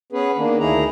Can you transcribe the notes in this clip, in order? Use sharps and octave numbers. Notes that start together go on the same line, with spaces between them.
B3 C#4 G#4 B4
D#3 A#3 D4
D2 D#4 E4 G#4 A#5